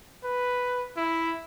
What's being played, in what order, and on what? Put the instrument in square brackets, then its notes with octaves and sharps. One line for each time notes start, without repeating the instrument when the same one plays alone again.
[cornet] B4
E4